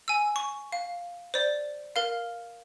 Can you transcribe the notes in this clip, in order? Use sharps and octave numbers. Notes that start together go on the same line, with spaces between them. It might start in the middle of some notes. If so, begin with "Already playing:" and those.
G#5 E6
C#6
F5
C5 D5
A#4 F5